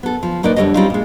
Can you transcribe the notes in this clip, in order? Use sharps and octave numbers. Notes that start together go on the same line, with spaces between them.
B3 A4
F3
A2 A#3 D#4 B4 D5
F2 D3 E3 G3 C#5 D#5
G3 C4 C#4 D#4 F4
A#2 G#3